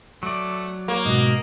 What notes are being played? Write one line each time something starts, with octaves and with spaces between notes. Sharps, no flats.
F#3 A3 D5
A#3 C#5
G#2 B2 F#4 D#5